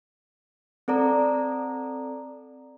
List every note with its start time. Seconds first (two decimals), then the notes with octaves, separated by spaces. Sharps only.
0.88 C4 A4 D5 A#5